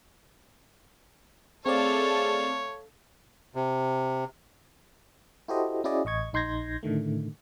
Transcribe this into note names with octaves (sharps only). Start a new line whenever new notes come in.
A3 C4 G#4 A4 C#5 D5 F5
C3
E4 F#4 G4 A4 C5 D#5
C#4 E4 F#4 G#4 D5 D#5
A1 D#5 C#6 G#6
A#1 D#4 C6 G6 G#6 A#6
A2 D3 D#3 A3